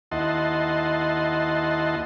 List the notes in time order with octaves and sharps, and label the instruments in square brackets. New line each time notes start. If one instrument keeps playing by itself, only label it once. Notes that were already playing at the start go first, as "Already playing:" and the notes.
[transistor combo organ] D#2 E4 D#5 F#5 A5 C6